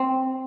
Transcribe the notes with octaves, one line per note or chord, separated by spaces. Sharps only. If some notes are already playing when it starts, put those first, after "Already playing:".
Already playing: C4